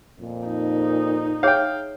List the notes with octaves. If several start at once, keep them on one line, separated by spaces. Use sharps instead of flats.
F2 A#2
D#4
G#4 C#5 E5 F5 G5